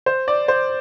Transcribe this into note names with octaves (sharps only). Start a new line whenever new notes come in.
C5
D5
C5